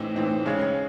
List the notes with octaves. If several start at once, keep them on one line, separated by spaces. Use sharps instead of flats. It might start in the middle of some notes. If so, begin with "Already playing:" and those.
Already playing: A2 E3 C4 D#4
A2 E3 C4 D#4
C#3 G#3 C#4 G#4